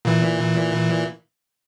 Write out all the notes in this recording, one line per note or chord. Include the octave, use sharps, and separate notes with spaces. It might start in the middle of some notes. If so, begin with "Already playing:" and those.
A#2 E3